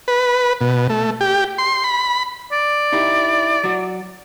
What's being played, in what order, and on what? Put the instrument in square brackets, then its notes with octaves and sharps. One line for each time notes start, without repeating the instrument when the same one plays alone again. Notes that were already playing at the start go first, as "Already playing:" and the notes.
[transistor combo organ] B4
B2
A3
G4
C6
B5
[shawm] D5
[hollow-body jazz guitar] D#4 E4 G4
F#3 F#4